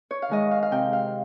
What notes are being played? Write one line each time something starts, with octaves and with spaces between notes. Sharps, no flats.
C#5
F5
D#3 G#3 D#5
F5
F5
C3 G5
F5